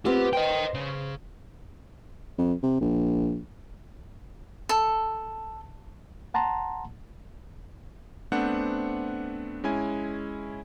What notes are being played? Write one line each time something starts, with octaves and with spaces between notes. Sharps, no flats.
B3 C4 F4 G4
C5 D#5 G5
C#3
F2
C3
A#1
A4
F#5 A5 A#5 C6
A3 B3 C4 D4 C5 F#5
G#3 C#4 E4 G#5